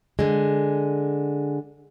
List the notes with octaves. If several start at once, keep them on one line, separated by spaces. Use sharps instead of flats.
D3 G#3